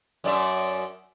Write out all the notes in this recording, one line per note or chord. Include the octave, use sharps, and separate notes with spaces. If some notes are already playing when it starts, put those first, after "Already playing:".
F#2 D5 E5